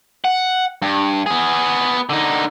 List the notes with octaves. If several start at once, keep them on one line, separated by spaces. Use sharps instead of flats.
F#5
G2
B3 G#4
D3 D#4